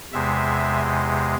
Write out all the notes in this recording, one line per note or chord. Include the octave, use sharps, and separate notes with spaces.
E2 C3 G#3 E5